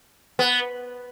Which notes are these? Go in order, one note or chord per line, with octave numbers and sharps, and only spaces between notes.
B3